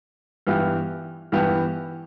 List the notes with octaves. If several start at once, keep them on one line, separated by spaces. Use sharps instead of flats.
G2 E3 B3 E4 G4
G2 E3 B3 E4 G4